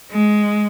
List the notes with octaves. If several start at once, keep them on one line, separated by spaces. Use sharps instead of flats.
G#3